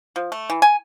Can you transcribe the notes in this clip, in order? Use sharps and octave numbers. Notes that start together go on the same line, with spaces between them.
F3
A3
E3
G#5